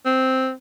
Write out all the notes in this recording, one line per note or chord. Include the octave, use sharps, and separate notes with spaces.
C4